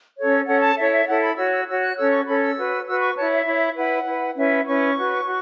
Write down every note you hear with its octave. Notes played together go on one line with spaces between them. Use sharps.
C#4 A4 C#5
C#4 A4 C#5 F#5
A5
E4 A4 C#5 E5
E5
E4 A4 C#5 F#5
B5
F#4 C#5 E6
E6
F#4 C#5 E6
F#6
C#4 A4 C#5 E6
C#6
C#4 A4 C#5 B5
E6
F#4 B4
F#4 B4 E6
C#6
E4 C#5 A5
E5
E4 C#5
E4 B4 F#5
E4 B4
C#4 E4 B4 E5
C#4 E4 B4 C#6
F#4 B4
F#4